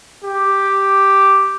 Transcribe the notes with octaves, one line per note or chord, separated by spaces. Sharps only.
G4